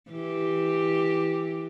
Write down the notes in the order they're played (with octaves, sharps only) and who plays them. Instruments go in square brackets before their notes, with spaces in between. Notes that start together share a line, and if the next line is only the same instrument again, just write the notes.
[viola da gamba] E3 G4